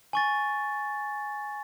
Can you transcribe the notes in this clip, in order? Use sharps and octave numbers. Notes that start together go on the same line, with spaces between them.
G#5 C#6 A6